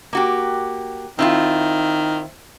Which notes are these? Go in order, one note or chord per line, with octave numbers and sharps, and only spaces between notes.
A#3 F#4 G4
D#3 C4 E4 F4